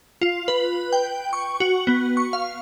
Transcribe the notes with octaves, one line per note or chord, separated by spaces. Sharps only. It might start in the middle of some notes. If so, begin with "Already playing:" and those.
F4
B4
G5
C#6
F#4
B3
C#6
F5